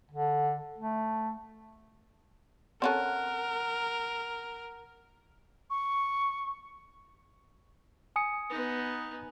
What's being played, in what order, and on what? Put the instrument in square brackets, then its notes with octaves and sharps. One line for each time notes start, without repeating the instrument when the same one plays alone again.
[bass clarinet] D3
A3
[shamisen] C4 C#4 A4 [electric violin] A#4 [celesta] F#5 F#6
[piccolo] C#6
[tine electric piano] G#5 D#6 C#7
[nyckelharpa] B3 D#4